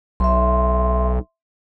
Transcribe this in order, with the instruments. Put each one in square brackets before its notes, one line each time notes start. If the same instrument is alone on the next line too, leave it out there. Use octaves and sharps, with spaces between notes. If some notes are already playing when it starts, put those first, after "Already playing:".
[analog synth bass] B1 [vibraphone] E5 C6